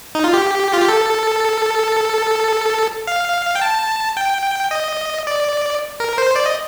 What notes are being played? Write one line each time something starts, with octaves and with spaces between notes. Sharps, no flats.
D#4
F4
G4
F4
G4
A4
F5
G5
A5
G5
D#5
D5
A#4
C5
D5
D#5